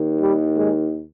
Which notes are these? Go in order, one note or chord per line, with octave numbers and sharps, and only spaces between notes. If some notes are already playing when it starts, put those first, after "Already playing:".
Already playing: D#2 D#3
G3
G#3